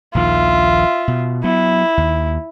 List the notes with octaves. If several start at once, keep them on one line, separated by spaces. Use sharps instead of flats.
A#1 D#2 D#3 F4 E5
B2
F#3 B3 E4
D#2